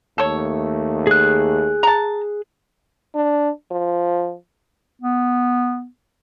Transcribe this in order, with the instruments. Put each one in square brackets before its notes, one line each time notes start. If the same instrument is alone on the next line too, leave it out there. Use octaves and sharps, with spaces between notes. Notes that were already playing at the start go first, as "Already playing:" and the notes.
[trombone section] D#2 A3 [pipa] A4 C#5
[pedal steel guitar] G#4 F#6
[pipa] A5 A#5
[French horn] D4
F3
[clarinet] B3